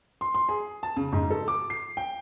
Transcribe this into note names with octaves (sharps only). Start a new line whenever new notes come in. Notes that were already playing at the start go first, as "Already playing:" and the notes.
C6
C6
G#4
A5
C#3
G#2
A4
D6
C7
G5